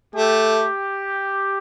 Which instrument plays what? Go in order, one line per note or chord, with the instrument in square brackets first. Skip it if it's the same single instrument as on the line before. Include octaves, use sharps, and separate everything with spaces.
[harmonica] A3 [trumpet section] G4